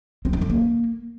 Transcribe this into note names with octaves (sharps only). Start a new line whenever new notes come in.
C4
D#4
D3
A#3